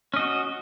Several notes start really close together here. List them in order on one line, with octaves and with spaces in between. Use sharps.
C#4 D#5 F#4